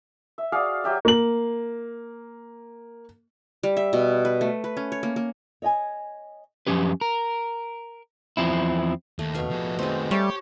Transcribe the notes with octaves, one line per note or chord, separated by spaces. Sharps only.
E5
F#4 G#4 D5 F5
F#3 G4 E5
A#3 F#7
G3
E5
B2
B4
A3
B4
C#4
C#5
A#3
A#3
C#5 D#5 G5 G#5
F#2 D#3 F3 C#4 G4 B4
A#4
E2 F3 C4 E4
D#2 A3
B2 E5 F5
F3 G#4
D#3 G#3 A3 C4
G3 A3 G4 C#5 A5